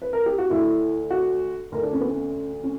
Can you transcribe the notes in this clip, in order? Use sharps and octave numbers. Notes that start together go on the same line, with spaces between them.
B4
A#4
G4
F#4
D2 D3 E4
F#4
D2 D3 A#4
D4
C#4
B3
C#4
C#4